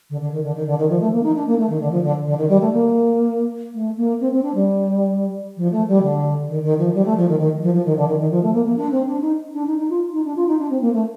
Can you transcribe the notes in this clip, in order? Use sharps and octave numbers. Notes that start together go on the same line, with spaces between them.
D3
D3
D#3
D3
D#3
D3
D#3
F3
A3
A#3
D#4
D4
A#3
A3
D#3
D3
F3
D3
D3
D#3
G3
A3
A#3
A3
A#3
C4
C4
D4
G3
F3
A3
G3
D3
D#3
D#3
F3
G3
A3
F3
D#3
D#3
F3
F3
D#3
D3
D#3
D#3
F3
A3
A#3
A#3
D4
C4
D4
D#4
D4
D#4
D#4
F4
D#4
D4
F4
D#4
D4
C4
A#3
A3